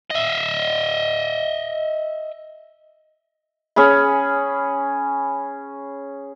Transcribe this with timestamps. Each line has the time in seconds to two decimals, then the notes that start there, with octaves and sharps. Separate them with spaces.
0.11 D#5 E5
3.76 C#4 G#4 G#5 B5